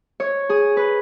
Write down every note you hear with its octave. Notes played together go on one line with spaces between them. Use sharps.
C#5
G#4
B4